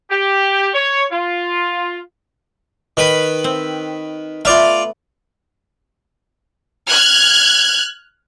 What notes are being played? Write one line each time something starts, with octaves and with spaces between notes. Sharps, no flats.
G4
C#5
F4
D#3 B4 B5
C4
A3 B3 F4 D5 F5
F6 F#6 G#6